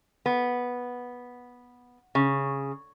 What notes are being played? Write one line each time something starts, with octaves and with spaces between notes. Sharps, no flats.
B3
C#3